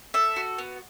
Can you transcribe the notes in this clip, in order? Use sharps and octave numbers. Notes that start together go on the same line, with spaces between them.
A4 E5
F#4
B3